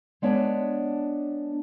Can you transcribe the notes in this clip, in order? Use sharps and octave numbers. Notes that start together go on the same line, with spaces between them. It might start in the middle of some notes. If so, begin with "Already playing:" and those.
G#3 B3 D4 C#5 D5